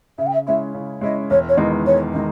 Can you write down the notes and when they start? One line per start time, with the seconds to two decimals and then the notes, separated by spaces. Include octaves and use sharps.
0.18 C#3 E5
0.26 G5
0.33 E5
0.47 G#3 C#4 E4 E5
0.74 C#3
1.01 G#3 C#4 E4 D#5
1.30 E1 C#5
1.48 C#5
1.57 E2 D#3 G#3 B3 D#5
1.85 E1 C#5
2.13 D#3 G#3 D#5